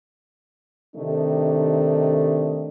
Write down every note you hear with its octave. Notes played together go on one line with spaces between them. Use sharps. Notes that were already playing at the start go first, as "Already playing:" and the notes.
C3 D#3 A3 D4 D#4